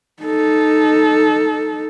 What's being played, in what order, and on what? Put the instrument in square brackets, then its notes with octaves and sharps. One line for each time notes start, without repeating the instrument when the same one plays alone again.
[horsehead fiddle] D#4 A4